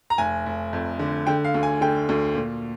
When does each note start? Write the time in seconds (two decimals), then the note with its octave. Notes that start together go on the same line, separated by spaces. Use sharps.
0.10 A#5
0.18 F1 G#5
0.46 F1
0.73 F2
0.99 D3
1.27 D3 G5
1.44 F5
1.54 D2
1.63 G#5
1.81 D3 G5
2.09 D2
2.35 A#2